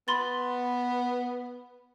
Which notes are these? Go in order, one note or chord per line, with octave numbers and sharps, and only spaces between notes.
B3 B5 C6 A6